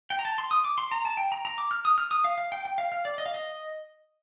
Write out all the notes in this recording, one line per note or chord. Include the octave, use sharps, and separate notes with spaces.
G5
A#5
A5
C6
D#6
D6
C6
A#5
A5
G5
A#5
A#5
D6
F6
D#6
F6
D#6
F5
F5
G5
G5
F5
F5
D5
D#5
F5
D#5